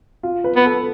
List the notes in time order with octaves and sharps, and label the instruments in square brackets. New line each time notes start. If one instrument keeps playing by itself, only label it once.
[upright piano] F4
B4
[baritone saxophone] B3
[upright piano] A4